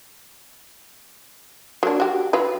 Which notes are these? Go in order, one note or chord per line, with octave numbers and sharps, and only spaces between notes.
F#3 A#3 D4
F#4 G4
F#3 F4 B4